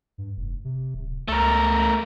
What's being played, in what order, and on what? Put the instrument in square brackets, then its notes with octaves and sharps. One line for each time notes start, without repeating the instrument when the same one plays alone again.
[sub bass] G2
F1
C3
D1
[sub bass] C#2 [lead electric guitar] A3 A#4